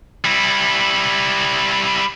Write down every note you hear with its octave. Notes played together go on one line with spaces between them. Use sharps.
G3 E4